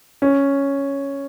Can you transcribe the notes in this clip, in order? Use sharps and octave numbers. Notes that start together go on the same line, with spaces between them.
C#4